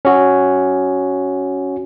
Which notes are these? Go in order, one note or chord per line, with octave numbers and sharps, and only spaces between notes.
C#4 F#4